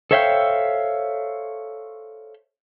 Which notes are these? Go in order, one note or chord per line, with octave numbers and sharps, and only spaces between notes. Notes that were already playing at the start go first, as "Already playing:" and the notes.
A4 C5 C#5 E5 F5 G5